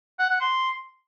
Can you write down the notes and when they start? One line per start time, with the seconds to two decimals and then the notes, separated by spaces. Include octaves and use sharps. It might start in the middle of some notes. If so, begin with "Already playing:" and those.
0.19 F#5
0.30 F#5
0.40 C6